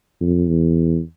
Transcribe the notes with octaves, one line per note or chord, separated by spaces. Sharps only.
F2
E2